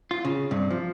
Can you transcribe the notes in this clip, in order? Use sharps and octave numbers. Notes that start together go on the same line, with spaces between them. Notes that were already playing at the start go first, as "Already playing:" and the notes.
F4
C#3
G2 C3
F3